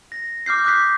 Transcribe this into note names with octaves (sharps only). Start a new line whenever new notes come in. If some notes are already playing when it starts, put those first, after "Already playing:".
A#6
D6 F6 G6 C7
D6 D#6 F#6 G6 B6 C7